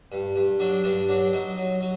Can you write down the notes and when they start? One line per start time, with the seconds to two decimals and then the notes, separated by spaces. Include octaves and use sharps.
0.12 G2
0.36 G2
0.60 F#3 D4
0.84 G2 D4
1.09 F#3 D4
1.33 F#3 D#4
1.57 F#3
1.81 F#3